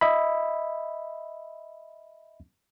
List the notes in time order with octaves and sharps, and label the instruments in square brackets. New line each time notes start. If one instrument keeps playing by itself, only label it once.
[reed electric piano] D#5 E5 B5